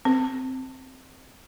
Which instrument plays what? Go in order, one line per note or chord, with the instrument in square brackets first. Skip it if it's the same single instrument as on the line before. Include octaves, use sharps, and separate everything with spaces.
[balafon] C4